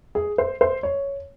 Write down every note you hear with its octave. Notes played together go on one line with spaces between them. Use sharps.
G#4
C5
C5
C#5